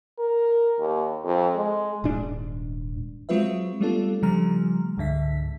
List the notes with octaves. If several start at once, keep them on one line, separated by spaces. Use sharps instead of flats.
A#4
D#2
F2
G#3
D#1 G#2 D4
F#3 G#3 C4 F4 B4 E5
G3 A3 B3 D4 F4 A4
C#3 F3 G3 A3 A#5 F6
C#2 G#2 D3 E5 B6